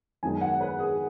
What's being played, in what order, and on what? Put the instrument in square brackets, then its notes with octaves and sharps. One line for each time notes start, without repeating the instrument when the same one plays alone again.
[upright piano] F#2 D#3 G#3 B3 D#4 G#5
F#5
B4
G#4